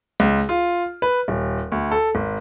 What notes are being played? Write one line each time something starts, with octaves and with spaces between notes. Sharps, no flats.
C#2
F4
B4
D#1
D2
A4
G#1